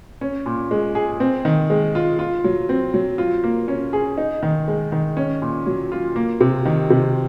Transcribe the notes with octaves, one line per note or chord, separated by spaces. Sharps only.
C#4
A#2
G#3
G#4
C4
D#3
G#3
F4
F4
F#3
C4
F#3
F4
A#3
C#4
G#4
D#4
D#3
G#3
D#3
C#4
A#2
F#3
F4
A#3
C3
D#3
C3